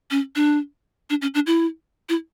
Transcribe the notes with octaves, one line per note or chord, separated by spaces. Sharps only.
C#4
D4
D4
C#4
D4
E4
E4